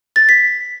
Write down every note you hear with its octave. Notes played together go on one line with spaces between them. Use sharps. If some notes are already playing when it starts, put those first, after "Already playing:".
A6
B6